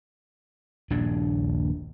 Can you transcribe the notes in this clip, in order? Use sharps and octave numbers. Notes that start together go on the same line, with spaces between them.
D#1 A#1 G2 D4